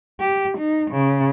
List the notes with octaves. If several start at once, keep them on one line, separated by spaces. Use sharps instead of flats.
G4
D#4
C#3